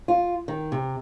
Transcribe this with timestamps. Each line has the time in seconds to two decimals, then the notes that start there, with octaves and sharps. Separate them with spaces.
0.08 F4
0.48 D#3
0.72 C3